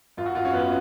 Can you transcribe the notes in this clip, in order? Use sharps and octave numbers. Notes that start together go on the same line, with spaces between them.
F#2 F4
F#4
F#2 F4
C#4
F#2 B3